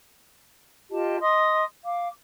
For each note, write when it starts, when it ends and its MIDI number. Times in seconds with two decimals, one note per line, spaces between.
0.91 1.17 65
0.91 1.17 67
0.91 1.17 75
0.91 1.17 81
1.21 1.63 75
1.21 1.63 84
1.21 1.63 87
1.85 2.07 77
1.85 2.07 86